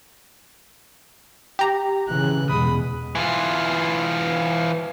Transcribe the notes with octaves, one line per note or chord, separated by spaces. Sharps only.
G4 A#5
C#3 E3 F#6
E2 B2 G#3 B5 D#6
E3 F4